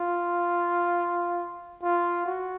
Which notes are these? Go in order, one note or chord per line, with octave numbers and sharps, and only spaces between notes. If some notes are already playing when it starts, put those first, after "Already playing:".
Already playing: F4
F4
F#4